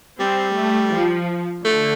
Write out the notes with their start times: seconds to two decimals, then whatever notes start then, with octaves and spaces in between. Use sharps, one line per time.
0.19 G3 C4
0.55 A3
0.92 F3
1.64 D3 A3